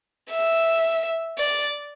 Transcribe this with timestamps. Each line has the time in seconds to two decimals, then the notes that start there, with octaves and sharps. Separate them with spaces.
0.31 E5
1.38 D5